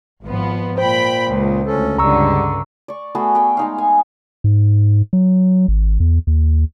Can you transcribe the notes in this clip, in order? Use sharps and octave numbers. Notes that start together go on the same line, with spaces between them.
G#1 F3 B3
A#2 C5 G5 B5
C#2
D2 C#4 A4
C#2 G2 D3 G3 A#5 C#6 E6
D5 C#6
A3 B3 F#4 G#4
B3 G5
G#3 D#4 F5
G#5
G#2
F#3
G#1
E2
D#2